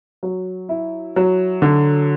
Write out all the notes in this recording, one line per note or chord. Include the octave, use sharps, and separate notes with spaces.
F#3
E4
F#3
D3